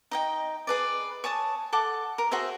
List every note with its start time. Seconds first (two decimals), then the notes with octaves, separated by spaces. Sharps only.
0.11 D#4 D#5 G5
0.67 G#4 B4 D5
1.24 C#5 G#5 A5 D#6
1.73 A4 F#5 D6
2.18 A#4
2.31 F#4 G#4 C5 E5